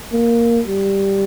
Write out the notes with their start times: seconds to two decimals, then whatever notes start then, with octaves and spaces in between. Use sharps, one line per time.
0.12 A#3
0.67 G3